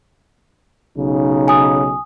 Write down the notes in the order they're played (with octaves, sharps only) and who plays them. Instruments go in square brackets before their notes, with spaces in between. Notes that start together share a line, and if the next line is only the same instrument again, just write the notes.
[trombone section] B1 C#3 D#4
[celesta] G#5 D#6